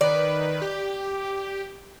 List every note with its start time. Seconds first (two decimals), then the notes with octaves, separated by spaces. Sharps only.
0.01 D#3 B4 D5
0.62 G4